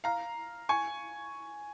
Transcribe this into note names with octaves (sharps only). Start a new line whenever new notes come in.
F5 A#5
G#5 C#6